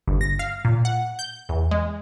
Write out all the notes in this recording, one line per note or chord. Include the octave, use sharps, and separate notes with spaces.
G1
A#6
F5
A#2
F#5
G6
E2
G#3